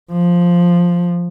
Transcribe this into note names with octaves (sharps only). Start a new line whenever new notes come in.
F3